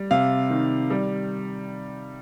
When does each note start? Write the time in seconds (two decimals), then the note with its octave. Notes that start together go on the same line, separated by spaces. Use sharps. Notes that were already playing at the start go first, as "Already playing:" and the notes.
Already playing: G3
0.11 C3 F5
0.50 D#3
0.90 G3